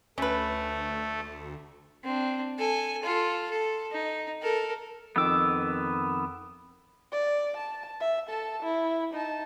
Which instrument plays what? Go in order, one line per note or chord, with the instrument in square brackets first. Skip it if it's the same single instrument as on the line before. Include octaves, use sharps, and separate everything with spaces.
[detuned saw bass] D2 [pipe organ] A3 [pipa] C#4 B4
[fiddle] C4 D4
A4 G#5
F4 A4
A4
D#4
A4 A#4
[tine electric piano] F2 D#3 D6 [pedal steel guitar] B3 E6
[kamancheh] D5
A5
E5
A4 A5
E4
D#4 A5